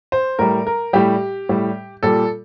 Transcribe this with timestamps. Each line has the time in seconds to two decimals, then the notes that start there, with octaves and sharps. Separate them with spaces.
0.12 C5
0.39 A2 G3 A#4
0.67 A#4
0.93 A2 G3 G4
1.49 A2 G3
2.03 A#2 G3 A4